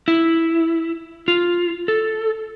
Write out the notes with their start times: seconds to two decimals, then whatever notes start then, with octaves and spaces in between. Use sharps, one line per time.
0.08 E4
1.28 F4
1.88 A4